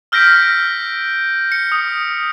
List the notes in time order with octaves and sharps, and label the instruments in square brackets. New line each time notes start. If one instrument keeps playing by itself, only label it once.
[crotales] E6 F6 G6 A#6 B6 D7
C#7
D#6